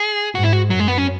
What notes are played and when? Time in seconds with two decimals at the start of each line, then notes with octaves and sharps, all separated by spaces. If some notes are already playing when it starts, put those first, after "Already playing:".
Already playing: G#4
0.35 G#2 F#4
0.44 E4
0.53 F#4
0.70 F#2 F#3
0.79 G#3
0.88 B3
0.98 C#4